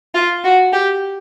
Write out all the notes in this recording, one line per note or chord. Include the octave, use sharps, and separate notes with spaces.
F4
F#4
G4